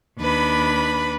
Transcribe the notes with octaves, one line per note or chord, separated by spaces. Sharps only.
D#2 D4 B4 B5